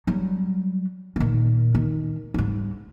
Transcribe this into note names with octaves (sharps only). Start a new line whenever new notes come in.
F#3 G3
A#2 D#3
D#3
G#2 G3